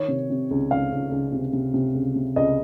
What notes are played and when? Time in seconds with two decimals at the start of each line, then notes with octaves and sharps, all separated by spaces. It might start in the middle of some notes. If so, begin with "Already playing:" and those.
Already playing: D#3 C#5
0.08 C3
0.30 C3
0.51 C#2
0.71 C#2 F5
0.92 C#2
1.12 C#2
1.32 C3
1.53 C3
1.74 C3
1.95 C#2
2.15 C3
2.36 C#2 D#5